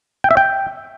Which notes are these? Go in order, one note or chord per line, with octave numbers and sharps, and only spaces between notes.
G5
E5
G5